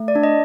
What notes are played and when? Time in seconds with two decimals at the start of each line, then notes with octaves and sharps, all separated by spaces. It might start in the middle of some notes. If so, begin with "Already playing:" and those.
Already playing: A3
0.08 D5
0.15 D4
0.23 D#5